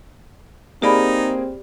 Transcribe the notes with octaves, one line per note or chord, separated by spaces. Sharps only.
A#3 C4 D#4 G4 G#4 D5 B5